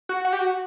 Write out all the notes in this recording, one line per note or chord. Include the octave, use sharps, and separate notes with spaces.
F#4
F#4
G4
F#4